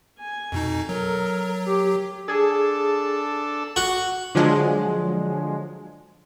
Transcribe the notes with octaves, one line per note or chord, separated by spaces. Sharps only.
G#5
F2 B2 D#4
F#3 A4 A#4
G4
D4 G#4 A4
F#4
D3 F3 F#3 G#3